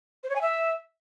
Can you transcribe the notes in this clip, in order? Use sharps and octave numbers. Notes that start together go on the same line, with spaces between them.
C5
C#5
G#5
E5